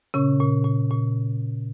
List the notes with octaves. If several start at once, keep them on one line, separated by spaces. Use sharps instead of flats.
A#2 C#3 C#4
A#2
A#2
A#2